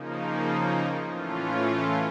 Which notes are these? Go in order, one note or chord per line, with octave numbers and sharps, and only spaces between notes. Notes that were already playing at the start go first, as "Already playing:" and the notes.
Already playing: C#3 F3 A#3 D#4
A2 E3 A3 C#4 F4